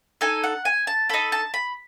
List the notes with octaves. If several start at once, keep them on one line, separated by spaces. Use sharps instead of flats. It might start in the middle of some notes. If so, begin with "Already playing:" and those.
D#4 A4 G#5
F#5
G#5
A5
D#4 A4 B5
A5
B5